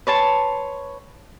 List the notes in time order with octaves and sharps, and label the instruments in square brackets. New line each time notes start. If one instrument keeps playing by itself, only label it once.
[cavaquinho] B4 C#5 A5 C6